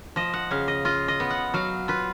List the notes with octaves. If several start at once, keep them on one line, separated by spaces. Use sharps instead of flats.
F3 D#5
F#5
C#3 F5
D#5
F4 D#5
D#5
B3
F#5
F#3 F5
F4 B4